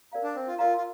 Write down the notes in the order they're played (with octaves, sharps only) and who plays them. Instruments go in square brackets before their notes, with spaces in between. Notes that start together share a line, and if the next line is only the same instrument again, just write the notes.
[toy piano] A#4 D5 F5 A#5
[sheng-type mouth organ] D4
C4
F4
[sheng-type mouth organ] F4 [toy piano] A#4 D5 F5 A#5
[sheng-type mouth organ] F4